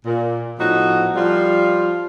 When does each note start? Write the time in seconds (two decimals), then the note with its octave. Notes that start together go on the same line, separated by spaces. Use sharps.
0.05 A#2
0.58 A2 F3 B3 D#4 F#4
1.15 F3 G3 F4